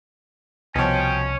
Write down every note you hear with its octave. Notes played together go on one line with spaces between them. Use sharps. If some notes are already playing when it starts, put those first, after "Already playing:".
C2 B2 F3 C#4 C#5 G5